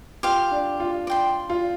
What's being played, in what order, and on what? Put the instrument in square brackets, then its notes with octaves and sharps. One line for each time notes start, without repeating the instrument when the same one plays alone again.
[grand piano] F4 [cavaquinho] G4 F5 C6
[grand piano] D4
F4
[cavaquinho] D5 G5 C6
[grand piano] F4